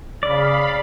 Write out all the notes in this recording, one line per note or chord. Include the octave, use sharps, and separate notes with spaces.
C#3 D5 F5 B5